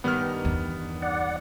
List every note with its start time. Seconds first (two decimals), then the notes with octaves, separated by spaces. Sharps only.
0.04 G2 D#3 G3 B3 F6
0.45 E2
1.02 D5 F#5